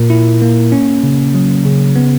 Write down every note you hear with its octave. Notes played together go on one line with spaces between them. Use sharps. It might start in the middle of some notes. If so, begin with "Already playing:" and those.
Already playing: A#2 A#4
E4
A#3
C#4
C#3
F#3
C#3
B3